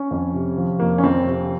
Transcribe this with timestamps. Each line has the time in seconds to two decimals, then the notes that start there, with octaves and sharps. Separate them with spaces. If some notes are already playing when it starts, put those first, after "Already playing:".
Already playing: C#4
0.11 F2
0.34 C3
0.57 F3
0.79 F2 A#3
0.98 C#4
1.03 F2 C4
1.26 C3